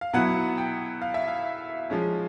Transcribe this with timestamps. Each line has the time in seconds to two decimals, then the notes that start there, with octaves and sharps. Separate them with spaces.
0.01 F5
0.13 B2 F#3 B3 E4 F#5
0.58 G5
1.01 F5
1.14 E5
1.28 F5
1.90 F3 G#3 C#4